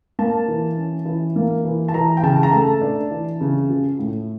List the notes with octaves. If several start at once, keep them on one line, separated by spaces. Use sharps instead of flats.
A#3 A5
E3
C#4
E3
A#3
E3
A5
E3 A#5
G5
C#3 A5
A#5
A3 A5
D4
E3
C#3
F3
A2